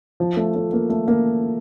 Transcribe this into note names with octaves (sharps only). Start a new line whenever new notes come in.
F3
A3
A3
A#3
A3
A#3